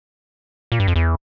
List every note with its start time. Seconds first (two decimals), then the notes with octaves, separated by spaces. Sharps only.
0.72 A#2
0.80 G2
0.88 F2
0.96 E2